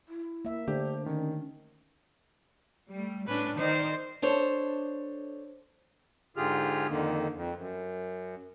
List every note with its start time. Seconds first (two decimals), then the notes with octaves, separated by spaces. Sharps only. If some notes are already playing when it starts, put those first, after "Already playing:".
0.08 E4
0.45 A#3 E5
0.68 D3 A3 D4 G4 C5
1.06 D#3 C#4
2.90 G3 A3
3.27 A2 C#4 D4 B4
3.58 D#3 D#4 C5 D5
4.22 D4 A4 C5 C#5
6.37 G#2 D3 F4 G4 G#4 F6
6.89 F2 D3 D#3 A#3
7.34 F2
7.57 F#2